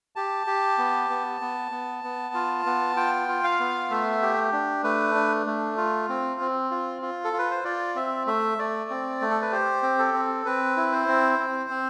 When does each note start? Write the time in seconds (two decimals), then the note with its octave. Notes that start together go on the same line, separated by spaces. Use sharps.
0.16 G4 A5
0.47 G4
0.78 B3
1.10 B3
1.41 B3
1.72 B3
2.04 B3
2.34 F4
2.66 B3
2.96 F4 G5
3.28 F4
3.44 F5
3.60 B3
3.90 A3 E5
4.22 G4
4.53 D4
4.84 A3 B4
5.15 D4
5.47 A3
5.77 F4
6.09 C4
6.40 C4
6.71 F4
7.02 F4
7.24 A4
7.33 F4
7.38 B4
7.51 C5
7.64 F4 D5
7.95 C4 E5
8.27 A3 E5
8.58 A3 D5
8.90 C4
9.21 A3
9.30 A4
9.42 B4
9.52 G4 C5
9.83 C4
9.99 A4
10.14 C4
10.45 C4 B4
10.77 E4
10.92 C5
11.08 C4
11.39 C4
11.70 C4